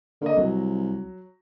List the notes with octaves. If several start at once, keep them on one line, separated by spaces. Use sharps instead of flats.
D3 A#3 D#5
C2 F#3